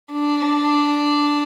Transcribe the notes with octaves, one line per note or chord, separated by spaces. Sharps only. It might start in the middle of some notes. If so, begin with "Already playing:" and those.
D4